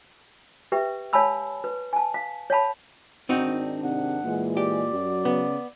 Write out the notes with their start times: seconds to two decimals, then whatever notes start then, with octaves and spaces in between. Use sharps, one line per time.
0.72 G4 B4 E5 G5
1.13 C#5 F5 G#5 A5 B5 E6
1.64 B4
1.93 G#5 A5
2.14 F5
2.50 C#5 F5 A5 B5
3.29 G#2 D#3 C4 D4 D#4 F#4
3.84 C3 F#5
4.24 A#2 E3 G#3
4.57 G4 D5
4.93 F#2 F#3
5.25 C#3 B3